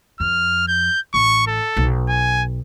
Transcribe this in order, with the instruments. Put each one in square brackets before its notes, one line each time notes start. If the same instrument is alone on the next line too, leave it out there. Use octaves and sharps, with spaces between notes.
[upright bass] F2 [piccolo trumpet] F6
[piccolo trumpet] G6
[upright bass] A1 [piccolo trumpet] C#6
[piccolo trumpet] A4
[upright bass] B1
[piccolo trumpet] G#5